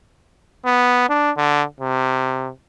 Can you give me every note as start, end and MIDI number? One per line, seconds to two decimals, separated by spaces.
0.65 1.06 59
1.09 1.31 62
1.37 1.64 50
1.80 2.50 48